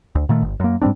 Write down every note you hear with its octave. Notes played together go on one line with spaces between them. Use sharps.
D2
A#2 D#3 A3
G1
F#2 A#3
G#2 G3 C4 D4